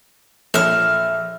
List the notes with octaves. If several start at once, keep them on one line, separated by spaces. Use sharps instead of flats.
A#1 A4 C#5 E5 F6